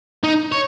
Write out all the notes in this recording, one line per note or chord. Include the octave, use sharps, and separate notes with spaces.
D#4
C#5